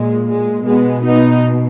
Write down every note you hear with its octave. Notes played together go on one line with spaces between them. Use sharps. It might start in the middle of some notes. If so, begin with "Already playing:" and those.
Already playing: A#2 G#3
G#3
B2 G#3 B3
B3 D#4